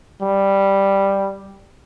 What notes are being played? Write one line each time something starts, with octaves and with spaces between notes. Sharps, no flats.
G3